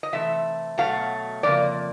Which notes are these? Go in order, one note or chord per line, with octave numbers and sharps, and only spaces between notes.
D#5
C3 E3 A3 E5
B2 F#3 A3 F5
F2 C#3 A#3 D5